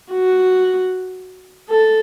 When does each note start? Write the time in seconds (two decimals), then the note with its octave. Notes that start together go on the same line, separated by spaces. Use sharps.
0.11 F#4
1.70 A4